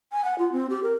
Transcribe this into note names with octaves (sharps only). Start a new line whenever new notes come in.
G#5
F#5
F4
C4
G4
A#4